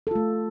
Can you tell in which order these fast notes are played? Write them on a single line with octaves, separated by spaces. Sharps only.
A4 F4 A3